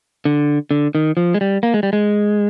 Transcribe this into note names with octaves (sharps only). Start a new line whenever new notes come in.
D3
D3
D#3
F3
G#3
G3
A#3
G#3
G3
G#3